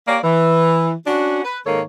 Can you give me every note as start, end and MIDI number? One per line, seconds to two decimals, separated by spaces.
0.07 0.19 58
0.07 0.19 67
0.07 0.19 73
0.07 0.19 74
0.24 0.92 52
1.06 1.43 61
1.06 1.43 62
1.06 1.43 66
1.44 1.59 71
1.65 1.81 44
1.65 1.81 51
1.65 1.81 58
1.65 1.81 69
1.65 1.81 73